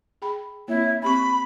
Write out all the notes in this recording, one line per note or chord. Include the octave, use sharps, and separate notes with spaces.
G#4 G5 B5
A#3 C4 E4 C#5
C4 G4 B5 C#6